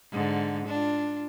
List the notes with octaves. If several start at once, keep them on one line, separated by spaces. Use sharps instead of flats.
G#2 D3
D4 F4